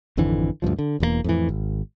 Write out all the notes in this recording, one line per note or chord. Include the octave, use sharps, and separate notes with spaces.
G#1 F2 D3 E3
D2 G2 A#2 F3
D3
E1 E2 F#3 A#3
F2 A2 E3
G#1